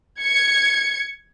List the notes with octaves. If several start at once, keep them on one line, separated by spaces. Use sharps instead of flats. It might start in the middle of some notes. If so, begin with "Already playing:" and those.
G#6 C#7